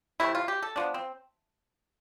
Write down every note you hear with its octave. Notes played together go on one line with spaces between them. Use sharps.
C3 E3 A3 E4
F4
G4
A4
D3 F3 B3 D4
C4